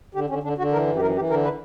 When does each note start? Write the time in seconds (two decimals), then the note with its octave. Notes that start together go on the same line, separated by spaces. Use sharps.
0.14 D3 G4
0.29 D3 C#4
0.43 D3 D4
0.58 D3 F#4
0.72 E3 A#4
0.87 F#2
0.95 G4
1.02 E3 A#4
1.15 E3 G4
1.30 D3 A#4
1.44 B4